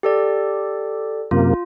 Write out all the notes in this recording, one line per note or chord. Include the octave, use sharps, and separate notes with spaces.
G4 A4 D5
F#2 C3 A#3 F4